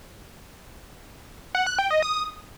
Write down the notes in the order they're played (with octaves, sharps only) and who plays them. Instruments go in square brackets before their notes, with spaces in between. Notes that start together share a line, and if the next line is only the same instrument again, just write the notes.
[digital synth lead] F#5
F#6
G5
D#5
D#6